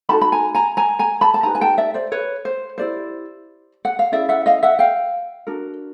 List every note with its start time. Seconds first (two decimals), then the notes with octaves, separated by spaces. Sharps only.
0.09 D#4 F#4 A4 A5 B5
0.21 B5
0.32 G#5 A#5
0.55 G#5 A#5
0.77 G#5 A#5
0.99 G#5 A#5
1.21 A5 B5
1.34 A5
1.43 D#4 G4 B4 G#5 A#5
1.55 G#5
1.61 G5 A5
1.78 D5 E5
1.94 C5 D5
2.12 B4 C#5
2.45 C5
2.78 E4 G4 A#4 C5 D5
3.85 F#5
3.99 F5
4.12 C#4 E4 G#4 D5 E5
4.29 E5 F#5
4.46 D#5 F5
4.63 E5 F#5
4.79 F5 G5
5.47 D4 F#4 A#4